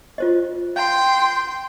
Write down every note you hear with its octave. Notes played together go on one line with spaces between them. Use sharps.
F4 C5 D#5
F5 G5 C6